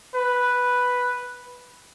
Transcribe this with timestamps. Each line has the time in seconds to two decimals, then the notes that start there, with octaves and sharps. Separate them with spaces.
0.15 B4